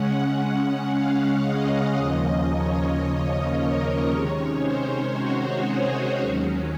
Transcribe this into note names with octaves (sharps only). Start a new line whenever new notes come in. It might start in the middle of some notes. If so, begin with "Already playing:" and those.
Already playing: C#3 G#3 C#4 F#5
F5
D#5
D#2 C#3 F3 A#3 C#4
C#5
A#4
C3 D#3 G#3 C#4 C#5
C5
F#4
G#4
D#2 D#3 F#3 C#4